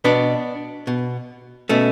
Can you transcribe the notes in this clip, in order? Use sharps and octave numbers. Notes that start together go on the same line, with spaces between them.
B2 B3 D4
B2
B2 A3 C#4